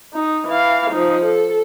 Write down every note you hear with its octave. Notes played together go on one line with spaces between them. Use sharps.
D#4
E3 F5
F3 D#4
A4